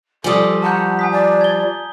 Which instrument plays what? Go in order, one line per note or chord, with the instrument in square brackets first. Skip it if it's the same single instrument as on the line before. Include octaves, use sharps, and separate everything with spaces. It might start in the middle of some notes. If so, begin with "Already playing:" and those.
[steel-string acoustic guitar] F3 G3 [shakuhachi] A4 [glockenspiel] G#5 D#6
[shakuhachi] F#5 [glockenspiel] A5 A#5 G6
[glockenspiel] G#5 D#6 B6
[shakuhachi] D5
[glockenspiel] G#6 G7